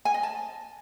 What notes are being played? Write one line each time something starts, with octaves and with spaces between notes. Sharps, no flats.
G#5
D#5
A5